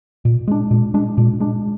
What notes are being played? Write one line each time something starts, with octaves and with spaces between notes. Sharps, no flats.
A#2
G#3 D4
A#2
G#3 D4
A#2
G#3 D4